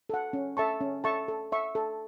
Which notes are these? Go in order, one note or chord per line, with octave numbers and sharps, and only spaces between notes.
A4 F#5
C#4
A4 E5 A5 C#6
C#4
A4 E5 A5 C#6
A4
E5 C#6
A4